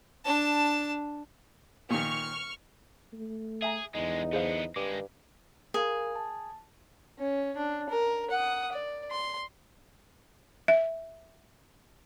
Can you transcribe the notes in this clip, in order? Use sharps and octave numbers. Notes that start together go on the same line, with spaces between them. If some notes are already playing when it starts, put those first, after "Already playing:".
D4 A5
A#2 D#3 C#6 F6
A3
G#4 E5 G#5 A#5
E2 D3 G#3 D#4
D3 B3 G#4 C5 F5
G2 D#3 G#3 D6
G#4 A#4 F5
A5
C#4
D4
A#4
F#5 D#6
D5
C6
E5